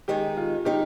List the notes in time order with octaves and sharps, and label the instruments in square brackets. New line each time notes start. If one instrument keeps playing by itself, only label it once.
[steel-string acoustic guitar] D#3 G#3 D#4 [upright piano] G4
[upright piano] F4
[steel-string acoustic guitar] D#3 G#3 D#4 [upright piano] G4